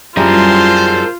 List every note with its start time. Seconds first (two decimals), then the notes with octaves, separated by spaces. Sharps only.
0.17 F#2 G3 E4 F4 G#4 A#4 C5